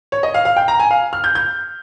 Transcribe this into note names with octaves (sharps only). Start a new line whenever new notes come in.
C#5
D#5
F5
F5
G5
A#5
G#5
F5
F6
G6
G6